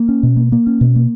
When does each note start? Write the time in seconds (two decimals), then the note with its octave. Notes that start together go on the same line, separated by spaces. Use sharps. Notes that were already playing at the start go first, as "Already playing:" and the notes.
Already playing: A#3
0.09 C#4
0.23 B2
0.37 A#3
0.52 A#3
0.67 C#4
0.81 B2
0.96 A#3